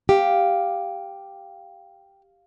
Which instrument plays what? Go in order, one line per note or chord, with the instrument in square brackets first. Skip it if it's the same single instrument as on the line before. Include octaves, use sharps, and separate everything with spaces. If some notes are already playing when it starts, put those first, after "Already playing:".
[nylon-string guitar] G4 [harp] F5